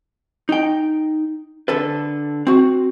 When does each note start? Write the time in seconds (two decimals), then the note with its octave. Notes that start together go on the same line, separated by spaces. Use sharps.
0.49 D#4 G5
1.68 D3 A4 B4
2.47 C4 F#4